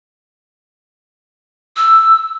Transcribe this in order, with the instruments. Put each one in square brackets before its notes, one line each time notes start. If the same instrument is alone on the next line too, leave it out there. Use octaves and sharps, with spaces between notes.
[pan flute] E6